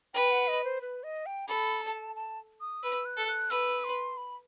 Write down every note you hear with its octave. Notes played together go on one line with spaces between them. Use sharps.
B4 G5
F#5
D#5
C5
B4
D#5
G5
A4 B5
A5
A5
D#6
B4 E6
F#6
A4
F#6
B4 E6
C6
B5